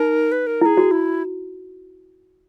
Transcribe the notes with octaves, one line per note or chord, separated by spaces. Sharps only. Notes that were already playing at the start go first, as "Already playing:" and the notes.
Already playing: D#4 A#4
B4
A#4
E4 G#4 A#4
F#4
E4